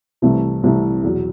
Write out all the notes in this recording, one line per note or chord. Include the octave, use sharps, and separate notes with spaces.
C2 C3 E3 A3 E4
C2 C3 E3 A3 E4
E2 B2 F#3